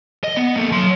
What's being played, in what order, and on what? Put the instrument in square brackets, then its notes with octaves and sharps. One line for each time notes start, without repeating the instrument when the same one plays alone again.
[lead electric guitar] D#5
B3
A#3 A4
F#3 C6